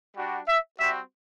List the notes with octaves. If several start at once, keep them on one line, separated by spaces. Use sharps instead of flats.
G3 D4 F#4
E5
G3 C4 F#4 E5